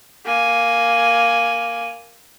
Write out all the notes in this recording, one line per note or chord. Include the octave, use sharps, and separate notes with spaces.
A#3 G#5